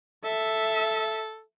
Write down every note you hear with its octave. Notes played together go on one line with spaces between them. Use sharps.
A4 E5